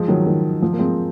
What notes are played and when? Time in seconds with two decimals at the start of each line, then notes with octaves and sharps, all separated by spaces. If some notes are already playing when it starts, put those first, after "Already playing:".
Already playing: F3 G#3
0.08 D#3 F#3
0.26 D#3
0.62 F3
0.73 A#3
0.79 G#3 C4